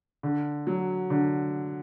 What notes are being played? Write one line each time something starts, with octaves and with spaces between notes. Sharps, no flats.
D3
F#3
D3